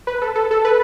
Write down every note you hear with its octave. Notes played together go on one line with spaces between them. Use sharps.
B4
A4
A4
A4
B4